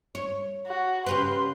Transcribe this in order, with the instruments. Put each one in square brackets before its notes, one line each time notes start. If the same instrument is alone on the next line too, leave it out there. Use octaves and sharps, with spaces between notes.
[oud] C#5
[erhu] F#4
[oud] C#3 G4 B4 [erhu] C6